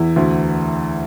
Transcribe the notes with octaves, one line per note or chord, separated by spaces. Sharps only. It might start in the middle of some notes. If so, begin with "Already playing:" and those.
Already playing: E2 E4
D2